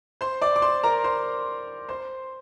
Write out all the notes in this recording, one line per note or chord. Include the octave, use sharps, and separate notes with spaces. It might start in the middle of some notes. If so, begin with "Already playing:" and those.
C5 C6
D5 D6
D6
C5 C6
A#4 A#5
C5 C6
C5 C6